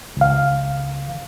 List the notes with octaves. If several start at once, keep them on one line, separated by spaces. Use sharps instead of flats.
C#2 F5